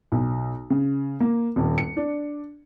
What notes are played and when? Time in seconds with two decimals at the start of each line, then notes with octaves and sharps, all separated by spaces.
0.12 B1
0.70 C#3
1.20 A#3
1.56 D#1
1.78 C#7
1.97 D4